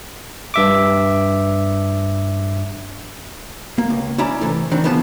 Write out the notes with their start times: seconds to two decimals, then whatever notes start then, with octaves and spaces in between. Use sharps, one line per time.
0.54 G2 E5 D6
3.78 A#3
3.90 C#2
4.18 C#4 E4 D5 A#5
4.41 C3 E3 A3
4.71 D#3 E3 C4 D4
4.84 C#3 E3 F3 B3 F#4 A5